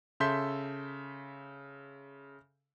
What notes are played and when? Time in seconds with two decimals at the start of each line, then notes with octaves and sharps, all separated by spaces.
0.20 C#3 A4 E5 C6 G6 B6